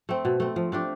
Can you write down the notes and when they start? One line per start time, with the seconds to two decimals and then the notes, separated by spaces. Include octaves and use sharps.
0.09 A3 C4
0.25 B2
0.40 A3 C4
0.56 F3
0.72 A3 D4 G4